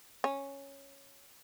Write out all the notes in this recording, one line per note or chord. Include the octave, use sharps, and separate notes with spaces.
C#4